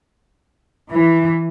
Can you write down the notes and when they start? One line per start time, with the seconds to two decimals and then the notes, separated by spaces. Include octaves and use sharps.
0.90 E3